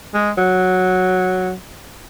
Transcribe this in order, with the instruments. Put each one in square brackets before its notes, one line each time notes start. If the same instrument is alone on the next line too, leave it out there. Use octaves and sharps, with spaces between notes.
[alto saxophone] G#3
F#3